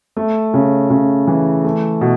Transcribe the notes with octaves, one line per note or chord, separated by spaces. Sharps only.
A3
C#3
C#3
E3
A3
B2